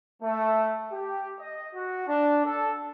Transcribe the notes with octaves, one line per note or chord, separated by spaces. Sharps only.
A3
G4
D#5
F#4
D4
A4